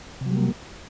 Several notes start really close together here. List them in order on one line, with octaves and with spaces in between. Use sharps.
C3 F#3 G3 A#3